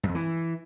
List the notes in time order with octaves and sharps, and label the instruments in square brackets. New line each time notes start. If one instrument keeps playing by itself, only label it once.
[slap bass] G2
F2
E3